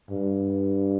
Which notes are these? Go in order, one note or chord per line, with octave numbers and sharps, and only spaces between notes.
G2